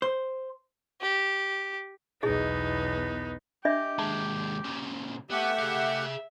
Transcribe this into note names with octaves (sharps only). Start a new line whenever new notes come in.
C5
G4
B1 E2 B3 D#4 E4 G#4 D#5
D4 G4 D#5 E5
D#2 G#3 A5
A#2 C#3
A3 B3 G4 E5 F#5
G#4 F5